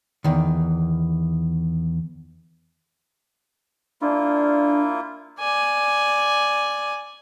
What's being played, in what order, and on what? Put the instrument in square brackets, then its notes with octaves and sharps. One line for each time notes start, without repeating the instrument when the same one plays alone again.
[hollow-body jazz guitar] E2 D#3
[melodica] A#3 E4 F4 [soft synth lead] D4
[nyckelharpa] D5 G#5